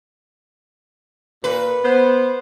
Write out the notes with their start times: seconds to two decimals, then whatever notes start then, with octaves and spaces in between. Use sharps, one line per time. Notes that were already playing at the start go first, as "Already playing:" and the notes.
1.44 A#2 B4
1.85 B3 C5